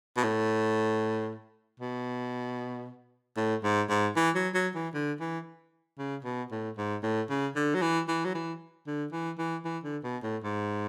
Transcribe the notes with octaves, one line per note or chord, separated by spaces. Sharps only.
B2
A2
B2
A2
G#2
G#2
E3
F#3
F#3
E3
D3
E3
C#3
B2
A2
G#2
A2
C#3
D3
F#3
E3
E3
F#3
E3
D3
E3
E3
E3
D3
B2
A2
G#2